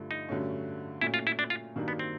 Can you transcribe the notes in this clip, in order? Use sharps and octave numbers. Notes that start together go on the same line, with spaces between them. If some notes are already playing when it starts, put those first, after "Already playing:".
Already playing: G2 D3 F3 A3
D#4
G2 D3 F#3 A3 C#4
A#2 F#3 A3 C#4 E4
F4
E4
D4
F4
G2 D#3 F#3 A#3 D4
B3
C4